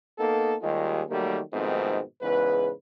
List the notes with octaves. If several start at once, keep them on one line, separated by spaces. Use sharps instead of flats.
A#3 B3 D#4 A4
D#2 D#3 G3 G#3 D#4 F4
D#3 F#3 G3 A3 A#3 G4
F2 G#2 B2 D#3 A3 C4
E2 G#2 C#3 B4